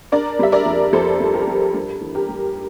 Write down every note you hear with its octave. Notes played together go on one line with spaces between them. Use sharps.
D4 A#4 D5
G3 E5
A#4 D5
F2
F2 A4 C5
G3
G4 A#4
G3
G2
E3
G4 A#4
G2